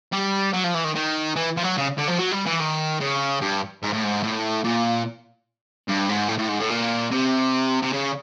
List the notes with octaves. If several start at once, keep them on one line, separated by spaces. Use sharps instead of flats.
G3
F#3
F3
E3
D#3
D#3
E3
F3
F#3
C#3
D3
F3
F#3
G3
E3
D#3
C#3
G2
G#2
A2
G#2
A2
A#2
G2
G#2
A2
A2
G#2
A2
A#2
C3
C3
C#3